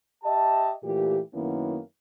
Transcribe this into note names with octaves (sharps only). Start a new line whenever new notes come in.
G4 D#5 E5 A5
A#2 E3 A3 G4
F#2 D#3 A#3 B3 C#4 E4